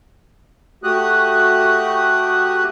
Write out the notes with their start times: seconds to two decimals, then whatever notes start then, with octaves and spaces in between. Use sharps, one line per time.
0.84 A3 F#4 G4 D#6 F#6